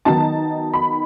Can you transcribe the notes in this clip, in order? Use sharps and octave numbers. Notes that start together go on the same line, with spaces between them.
D#3 F#3 B3 D#4 A5
B5